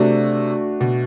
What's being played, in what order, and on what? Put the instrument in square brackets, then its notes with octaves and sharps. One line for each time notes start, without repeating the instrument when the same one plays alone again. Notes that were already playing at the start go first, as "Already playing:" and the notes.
Already playing: [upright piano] C3 [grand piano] A3 D4 F#4
[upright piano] B2